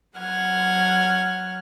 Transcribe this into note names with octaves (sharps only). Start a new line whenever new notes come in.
F#3 F#5 F6 G#6